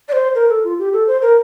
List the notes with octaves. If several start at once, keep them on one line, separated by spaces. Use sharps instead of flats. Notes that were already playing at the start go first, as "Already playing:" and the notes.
D5
C5
A#4
A4
F4
G4
A4
C5
A#4